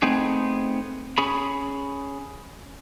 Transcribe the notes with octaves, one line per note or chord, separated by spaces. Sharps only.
A3 B3 C4 D#4 G#4
C#4 G#4 B5